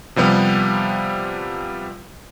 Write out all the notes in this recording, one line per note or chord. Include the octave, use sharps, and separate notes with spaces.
C3 F3 G3 B3